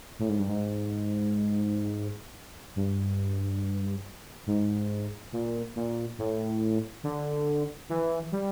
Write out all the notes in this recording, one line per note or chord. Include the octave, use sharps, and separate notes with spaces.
A2
G#2
G2
G#2
G2
G#2
A#2
A#2
A2
D3
E3
G3